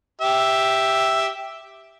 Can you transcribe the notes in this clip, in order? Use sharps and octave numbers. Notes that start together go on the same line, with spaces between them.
G4 E5